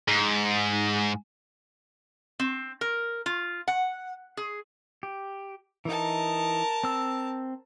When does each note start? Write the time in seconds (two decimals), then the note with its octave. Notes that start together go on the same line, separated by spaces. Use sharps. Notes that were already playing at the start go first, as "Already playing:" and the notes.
0.08 G#2
2.40 C4
2.81 A#4
3.26 F4
3.68 F#5
4.37 G#4
5.03 G4
5.85 E3 D#4 A#4 A5
6.84 C4 E6